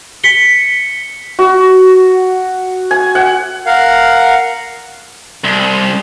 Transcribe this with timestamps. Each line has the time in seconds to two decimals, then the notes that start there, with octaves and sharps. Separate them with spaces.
0.24 B6 C#7 G7
1.39 F#4
2.91 G#5
3.15 F#5
3.66 A#4 F5 F#5
5.44 C2